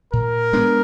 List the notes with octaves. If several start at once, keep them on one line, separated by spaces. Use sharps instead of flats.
A#2 A#4
G#3 B3 D4